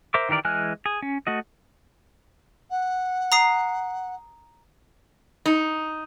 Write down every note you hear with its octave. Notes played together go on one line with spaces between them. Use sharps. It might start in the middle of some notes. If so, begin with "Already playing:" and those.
A#4 C5 E5 D6
D#3 E3 G4 A#4 D5
E3 G#3 G#5 F6 F#6
G#4
C#4
A3 F#4 D#5
F#5
A#5 D#6 C7
D#4